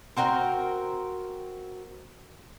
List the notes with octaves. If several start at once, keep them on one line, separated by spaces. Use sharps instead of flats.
C4 F#4 A#4 G5